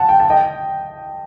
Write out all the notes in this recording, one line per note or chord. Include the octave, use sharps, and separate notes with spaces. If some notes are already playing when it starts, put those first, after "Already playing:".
Already playing: F#5 A5
G5
A5
D#5 G5